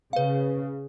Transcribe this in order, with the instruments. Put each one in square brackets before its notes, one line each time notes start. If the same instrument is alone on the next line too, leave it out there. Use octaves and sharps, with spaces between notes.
[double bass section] C#3 [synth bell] B4 F5